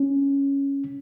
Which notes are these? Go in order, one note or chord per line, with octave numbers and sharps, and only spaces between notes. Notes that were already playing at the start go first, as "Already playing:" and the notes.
Already playing: C#4